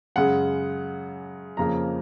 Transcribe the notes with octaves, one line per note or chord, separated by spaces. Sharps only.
F#2 C#3 G#3 F#5
F2 C#3 F3 A#3 A#5